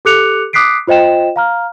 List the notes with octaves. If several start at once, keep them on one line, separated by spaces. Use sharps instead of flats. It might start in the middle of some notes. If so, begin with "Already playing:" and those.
G4 A4 D6 F#6 C#7 F7
D6 D#6 F#6 B6 C7 D7
F4 C5 D#5 G5 E7
F5 A#5 F6